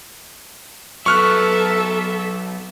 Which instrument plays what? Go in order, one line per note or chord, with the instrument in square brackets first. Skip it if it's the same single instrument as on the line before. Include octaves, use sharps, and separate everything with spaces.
[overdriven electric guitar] F#3 B3 [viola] A4 E5 [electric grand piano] C#6 F6 F#6